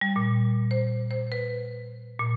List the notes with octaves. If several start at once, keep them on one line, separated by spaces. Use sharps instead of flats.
G3
A#2
C5
C5
B4
A#2